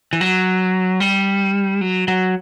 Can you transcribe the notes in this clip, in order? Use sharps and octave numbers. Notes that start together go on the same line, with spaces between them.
E3
F#3
G3
F#3
F#3